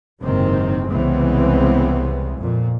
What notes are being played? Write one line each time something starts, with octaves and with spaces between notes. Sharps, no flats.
F#1 G#2 C3 D#3 C4
C2 C#3 E3 G#3 B3 C4
F2 A#2